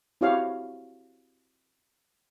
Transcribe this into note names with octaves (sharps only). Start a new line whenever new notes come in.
C4 E4 F#4 G4 C#5 F5